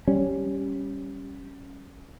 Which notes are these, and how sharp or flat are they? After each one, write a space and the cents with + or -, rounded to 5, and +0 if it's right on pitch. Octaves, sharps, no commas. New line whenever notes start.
G3 +0 C#4 -5